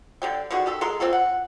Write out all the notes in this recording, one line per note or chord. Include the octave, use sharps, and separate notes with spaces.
D3 G3 G5
D3 D#3 G#3 F#4
D#3 G4 A4
G#3 A4 A#4 C6
A#3 C4 F4 A4
F#5